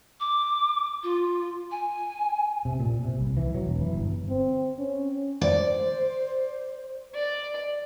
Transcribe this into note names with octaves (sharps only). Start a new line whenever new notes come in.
D6
F4
G#5
C3
A#2
C3
C2
E3
F#3
E1
E3
G1
C4
C#4
C5 D5
D5